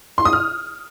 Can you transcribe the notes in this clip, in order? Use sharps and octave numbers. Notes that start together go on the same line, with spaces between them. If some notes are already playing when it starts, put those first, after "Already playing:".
C6
D#6
F6